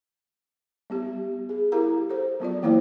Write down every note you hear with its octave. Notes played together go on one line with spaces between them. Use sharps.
G3 B3 G4
G#4
E4 G4 A#4 F5 A#5
A4 C5
F#3 B3 F4 D5
E3 A#3 E4 C5 F5 G5